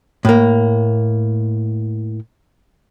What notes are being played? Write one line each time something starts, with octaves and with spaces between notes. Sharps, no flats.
A2 A#3